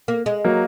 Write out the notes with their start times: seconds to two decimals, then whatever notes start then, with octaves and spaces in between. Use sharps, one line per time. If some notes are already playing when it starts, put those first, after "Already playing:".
0.08 A#3
0.26 G#3
0.45 F#3 A#3